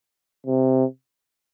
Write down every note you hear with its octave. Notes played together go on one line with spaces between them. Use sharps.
C3